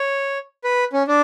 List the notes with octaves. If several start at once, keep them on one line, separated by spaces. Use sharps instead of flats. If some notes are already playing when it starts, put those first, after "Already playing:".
Already playing: C#5
B4
C#4
D4